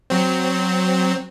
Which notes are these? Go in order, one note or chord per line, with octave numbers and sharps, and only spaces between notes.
F#3 C4